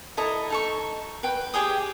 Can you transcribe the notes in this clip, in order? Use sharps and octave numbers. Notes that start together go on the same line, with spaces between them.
E4 A4 D#5 A#5
D#4 A4 C#6
B4 G5
G4 G#4 G5 D#6